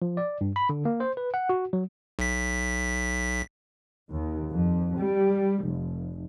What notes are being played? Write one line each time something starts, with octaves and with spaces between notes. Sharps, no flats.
F3
D5
G2
B5
D3
A#3
C5
B4
F#5
F#4
F#3
B1 B6
D#2
F2
G3
F1